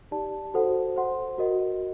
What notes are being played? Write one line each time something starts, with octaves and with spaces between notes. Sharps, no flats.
D#4 G4 D5 A5
F#4 A4 C5 F#5
C5 F#5 C6
F#4 A#4 D#5 F#5